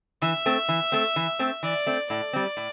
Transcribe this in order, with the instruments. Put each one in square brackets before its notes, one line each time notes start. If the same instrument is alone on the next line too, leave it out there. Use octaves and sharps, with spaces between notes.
[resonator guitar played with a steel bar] E3 [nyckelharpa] E5
[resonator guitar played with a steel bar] A3 C4
E3
A3 C4
E3
A3 C4
[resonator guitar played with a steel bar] E3 [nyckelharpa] D5
[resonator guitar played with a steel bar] A3 C4
[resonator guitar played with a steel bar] A2 [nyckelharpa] D5
[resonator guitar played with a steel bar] G3 C4
A2